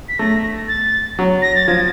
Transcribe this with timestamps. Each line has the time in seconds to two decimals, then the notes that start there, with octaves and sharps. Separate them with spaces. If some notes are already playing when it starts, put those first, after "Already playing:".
0.09 B6
0.19 A3 A#6
0.68 A6
1.19 F#3
1.42 A#6
1.55 A6
1.68 F3 G#6